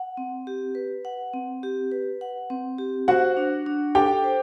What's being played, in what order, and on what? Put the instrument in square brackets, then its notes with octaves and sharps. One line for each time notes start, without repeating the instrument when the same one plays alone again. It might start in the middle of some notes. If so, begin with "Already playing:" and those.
Already playing: [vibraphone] F#5
C4
G4
B4
F#5
C4
G4
B4
F#5
C4
G4
[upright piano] F#4 F#5 [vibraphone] C5
[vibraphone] D4
D4
[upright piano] G4 G5 [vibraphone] A4
[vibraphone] C5